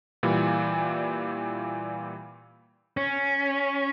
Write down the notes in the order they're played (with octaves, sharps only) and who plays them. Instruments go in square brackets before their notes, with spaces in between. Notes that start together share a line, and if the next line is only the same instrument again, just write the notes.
[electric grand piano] A#2 E3 G3
[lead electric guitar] C#4